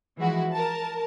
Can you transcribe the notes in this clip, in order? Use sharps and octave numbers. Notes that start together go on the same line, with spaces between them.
E3 F3 G#3 E4 F#4
A#4 A5